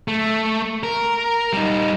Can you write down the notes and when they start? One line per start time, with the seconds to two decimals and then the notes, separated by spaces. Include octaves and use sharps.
0.08 A3
0.83 A#4
1.53 G3 D#4